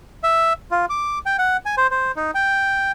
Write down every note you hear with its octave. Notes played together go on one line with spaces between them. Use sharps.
E5
F4
D6
G5
F#5
G#5
C5
C5
D#4
G5